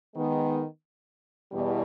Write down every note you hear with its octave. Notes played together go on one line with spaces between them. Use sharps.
D#3 G#3 B3
E2 B2 G3